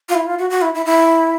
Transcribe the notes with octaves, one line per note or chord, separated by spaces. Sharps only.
F4
E4
F4
F#4
F#4
E4
E4
E4